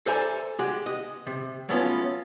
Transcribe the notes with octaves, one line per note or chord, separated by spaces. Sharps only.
A4 C5 D5 E5 G#5 A#5
G#3 F#4 G4
D#5
C3
F#3 A3 B3 C#4 F4